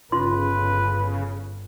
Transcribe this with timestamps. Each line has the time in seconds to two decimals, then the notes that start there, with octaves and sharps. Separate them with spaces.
0.12 G1 C#3 F4 B4 C6